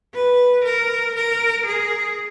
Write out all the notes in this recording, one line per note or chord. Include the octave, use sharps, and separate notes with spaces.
B4
A#4
A#4
G#4